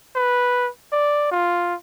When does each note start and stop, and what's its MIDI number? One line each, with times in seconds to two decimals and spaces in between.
0.16 0.69 71
0.92 1.29 74
1.31 1.75 65